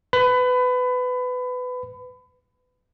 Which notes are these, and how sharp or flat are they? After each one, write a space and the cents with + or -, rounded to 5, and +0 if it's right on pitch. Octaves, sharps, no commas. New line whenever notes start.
B4 +20 B5 +25